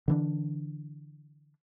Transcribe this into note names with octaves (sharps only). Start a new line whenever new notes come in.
D3 E3 D4